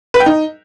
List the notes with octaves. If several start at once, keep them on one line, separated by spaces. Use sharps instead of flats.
B4
G5
D#4